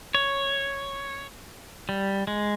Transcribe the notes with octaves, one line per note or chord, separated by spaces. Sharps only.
C#5
G3
G#3